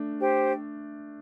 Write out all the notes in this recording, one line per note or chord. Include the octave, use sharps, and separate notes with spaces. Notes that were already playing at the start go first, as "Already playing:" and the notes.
Already playing: A3 D4
G4 C5 G5